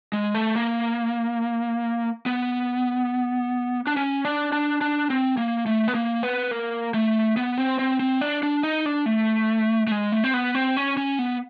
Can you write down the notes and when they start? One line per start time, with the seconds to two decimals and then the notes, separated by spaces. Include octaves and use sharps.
0.13 G#3
0.35 A3
0.55 A#3
2.26 B3
3.87 D4
3.96 C#4
4.25 D4
4.52 D4
4.81 D4
5.10 C4
5.37 A#3
5.66 A3
5.88 B3
5.95 A#3
6.23 B3
6.51 A#3
6.94 A3
7.37 B3
7.58 C4
7.79 C4
8.00 C4
8.21 D4
8.43 D4
8.63 D#4
8.86 D4
9.06 A3
9.87 A3
9.92 G#3
10.12 A3
10.24 C4
10.34 B3
10.55 C4
10.77 C#4
10.97 C#4
11.19 B3